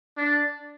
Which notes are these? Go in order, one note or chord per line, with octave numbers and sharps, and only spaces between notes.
D4